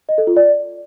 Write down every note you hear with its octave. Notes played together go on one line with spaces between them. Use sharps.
D#5
A4
F4
D5